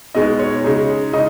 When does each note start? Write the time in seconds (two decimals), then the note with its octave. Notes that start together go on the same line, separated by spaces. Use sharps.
0.15 B2 G#3 D#4 D#5
0.39 C#5
0.64 C#3 G#3 D#4
1.13 C#3 G#3 D#4 D#5